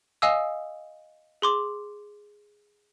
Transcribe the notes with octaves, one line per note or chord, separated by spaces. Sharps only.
D#5 F5 G#5 D#6 E6
G#4 C6 D6